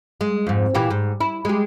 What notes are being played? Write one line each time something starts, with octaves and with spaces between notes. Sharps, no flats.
G#3
F2 G#2
A#2 E3 G4
G#2
E4
G#3 G4